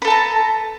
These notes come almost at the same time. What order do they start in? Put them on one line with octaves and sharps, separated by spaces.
B4 A4 A5 A#5